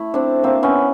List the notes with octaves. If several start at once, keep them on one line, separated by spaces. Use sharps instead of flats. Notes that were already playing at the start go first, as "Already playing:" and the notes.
Already playing: A3 E4
C4 D4
A#3 C4
B3 C#4